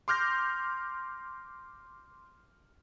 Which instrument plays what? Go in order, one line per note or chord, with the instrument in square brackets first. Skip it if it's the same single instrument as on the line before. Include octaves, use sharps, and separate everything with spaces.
[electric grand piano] C6 D6 F6 G6 A#6